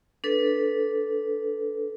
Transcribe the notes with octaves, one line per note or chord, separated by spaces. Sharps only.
D4 A4 B4